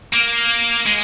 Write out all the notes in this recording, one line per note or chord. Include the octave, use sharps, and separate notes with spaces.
A#3
G#3